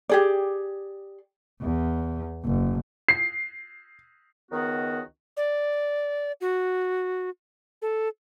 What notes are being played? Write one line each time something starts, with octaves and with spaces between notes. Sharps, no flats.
G4 G#4 D5
E2
F#1
C7
C#2 D#3 B3 F#4
D5
F#4
A4